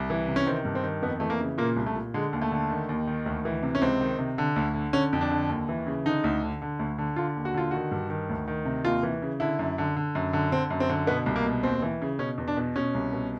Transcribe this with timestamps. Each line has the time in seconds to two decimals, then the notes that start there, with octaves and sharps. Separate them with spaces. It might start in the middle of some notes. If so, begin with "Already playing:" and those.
Already playing: C2
0.10 E3
0.28 C3
0.36 C#4
0.47 D#3 C4
0.65 G2
0.75 C4
0.83 D#3
1.02 F2 B3
1.20 E3 A3
1.30 A#3
1.40 C#3
1.58 A#2 A#3
1.77 C2
1.86 A3
1.95 A#2
2.14 D3 G#3
2.33 D#2
2.42 A3
2.52 D3
2.70 D#3
2.89 D#2
3.07 D#3
3.26 D2
3.45 E3
3.63 C3
3.75 C#4
3.82 C#2 C4
4.01 D#3
4.19 C3
4.38 D3
4.56 D2
4.74 D3
4.93 D3 C#4
5.13 F2
5.21 D4
5.31 D3
5.49 D#2
5.69 E3
5.87 C#3
6.05 D3 D#4
6.24 D2
6.42 D3
6.62 D3
6.79 D2
6.98 D3
7.16 D3 F4
7.36 D#2
7.45 F#4
7.54 D3 F4
7.71 D#3 F#4
7.91 G2
8.10 D#3
8.29 D2
8.48 D#3
8.65 C3
8.85 D#2 F4
9.03 E3
9.22 C#3
9.40 D3 E4
9.59 F#2
9.78 D3
9.96 D3
10.15 F#2
10.33 D3
10.51 D3 C4
10.70 F#2
10.80 C4
10.89 D3
11.07 B2 B3
11.26 C2
11.36 A#3
11.45 B2
11.63 D#2 C4
11.82 E3
12.02 C#3
12.19 B2 C#4
12.38 E2
12.48 D4
12.57 B2
12.76 B2 C#4
12.95 C2
13.13 B2